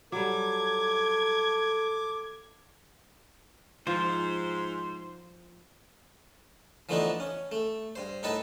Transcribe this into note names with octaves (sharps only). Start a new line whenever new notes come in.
F#3 G3 A4 D6 G#6
G#2 F3 F4 C5
E3 F3 A3 B3 D4 D#4
C#4
A3
G2 C5
A2 D#4 A4 B4 A5